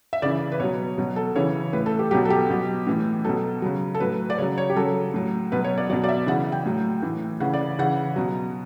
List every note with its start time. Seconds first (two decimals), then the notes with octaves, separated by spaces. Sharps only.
0.13 E5
0.22 C#3 E3 D5
0.52 B4
0.60 B2 F#3 C#5
0.98 B2 F#3
1.16 A4
1.36 C#3 E3 C#5
1.73 A2 E3 B4
1.86 A4
1.99 G4
2.11 B2 F#3 G4
2.25 A4
2.30 G4
2.50 B2 F#3
2.87 A2 E3
3.24 B2 F#3 A4
3.62 C#3 F#3
3.95 A4
4.00 A2 F#3 B4
4.30 D5
4.38 C#3 F#3 C#5
4.58 C#5
4.70 G4
4.76 C#3 F#3 A4
5.14 A2 F#3
5.52 B2 F#3 B4
5.64 C#5
5.78 D5
5.89 F#3 D5
5.92 B2
6.04 D5
6.09 E5
6.27 C#3 E3 F#5
6.52 G5
6.65 A2 F#3
7.02 A2 E3
7.40 C#3 E3 F#5
7.54 D5
7.79 C#3 E3 F#5
8.16 B2 F#3